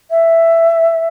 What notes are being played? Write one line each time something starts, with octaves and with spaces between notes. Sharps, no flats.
E5